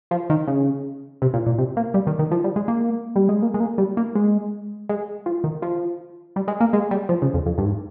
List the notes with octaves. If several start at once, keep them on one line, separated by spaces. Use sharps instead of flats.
F3
D#3
C#3
C3
A#2
A#2
C3
A#3
G3
D#3
D#3
F3
G3
G#3
A#3
G3
G#3
A#3
G#3
A#3
G3
A#3
G#3
G#3
F3
D#3
F3
G3
G#3
A#3
G#3
G3
F3
C#3
F2
F2
G2
G#2